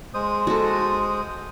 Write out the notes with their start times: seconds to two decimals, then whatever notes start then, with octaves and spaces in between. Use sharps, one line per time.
0.14 G#3 C5 D#6
0.47 F#4 A4